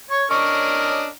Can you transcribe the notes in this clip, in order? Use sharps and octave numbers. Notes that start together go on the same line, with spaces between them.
C#5 C#6
C#4 D4 A#4 D#5 C#6